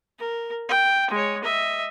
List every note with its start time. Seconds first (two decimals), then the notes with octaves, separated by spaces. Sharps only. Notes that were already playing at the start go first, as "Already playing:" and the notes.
0.19 A#4
0.69 G5
1.11 G#3 C#5
1.44 D#5 E5